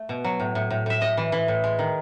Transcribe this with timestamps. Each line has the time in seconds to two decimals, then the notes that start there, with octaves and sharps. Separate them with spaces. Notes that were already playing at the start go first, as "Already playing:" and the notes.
Already playing: A3
0.09 B2
0.24 F#3
0.40 A2
0.55 A2
0.70 A2
0.86 A2 E5
1.01 A2 D#5
1.17 E3
1.32 E3
1.48 A2
1.64 G#3
1.79 D#3